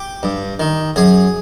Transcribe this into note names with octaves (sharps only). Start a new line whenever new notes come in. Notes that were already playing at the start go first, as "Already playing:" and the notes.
Already playing: G4
G2
D#3
F#2 G#4